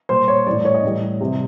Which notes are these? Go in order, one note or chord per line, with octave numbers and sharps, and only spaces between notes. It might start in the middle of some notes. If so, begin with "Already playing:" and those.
A#2 G3 C5
C#5
A2 E3 G3 D5
C#5
D#5
A2 E3 G3
C3 E3 G3